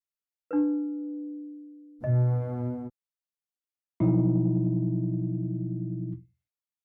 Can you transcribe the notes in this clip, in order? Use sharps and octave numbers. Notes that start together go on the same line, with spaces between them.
D4 B4
B2 D#5
B2 F3 F#3 D#4 E4